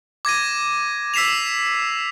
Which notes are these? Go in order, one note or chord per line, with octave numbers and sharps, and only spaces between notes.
D6 G#6 A#6 D#7
E6 B6 C7 E7 F7